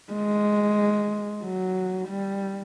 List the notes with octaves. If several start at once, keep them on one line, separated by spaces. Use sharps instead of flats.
G#3
F#3
G3